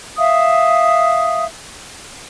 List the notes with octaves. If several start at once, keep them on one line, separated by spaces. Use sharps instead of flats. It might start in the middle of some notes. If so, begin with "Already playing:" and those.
E5 F5 D#6